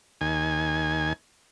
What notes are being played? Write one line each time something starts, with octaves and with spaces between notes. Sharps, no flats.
D#2 G#5